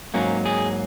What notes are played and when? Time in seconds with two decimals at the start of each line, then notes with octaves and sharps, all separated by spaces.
0.14 G#2 F#3 A#3 C#4
0.46 G#4